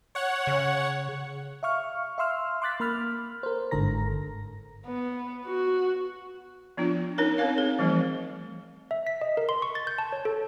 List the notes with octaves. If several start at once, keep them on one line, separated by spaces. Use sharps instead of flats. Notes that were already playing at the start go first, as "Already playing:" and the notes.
C#5 F#5
C#3
E5 F5 C#6 F6
E5 F5 C6 E6 F6
C6 D6 F#6 A6 B6
A#3 B5 F6
A#4 C5
G1 G#2 D3 A4 A#5 A#6
B3
F#4
F3 B3 D4 F4
C#4 D#4 A#4 C#5
C4 A#4 C#5 F5
G#4
E3 F3 G3 A3 C4
E5
B6
D#5
A#4
C6
C#6
A6
G6
A5
C#5
A4